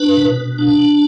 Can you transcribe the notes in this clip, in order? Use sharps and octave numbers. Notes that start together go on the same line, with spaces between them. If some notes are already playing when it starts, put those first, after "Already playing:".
Already playing: D4 B4
B2
D4